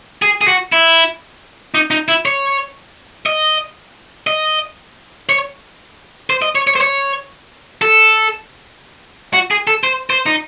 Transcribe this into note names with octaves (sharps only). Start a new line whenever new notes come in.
G#4
G#4
F#4
E4
D#4
D#4
E4
C#5
D#5
D#5
C#5
C5
D#5
C#5
C#5
C5
C#5
A4
F#4
G#4
A4
C5
C5
D#4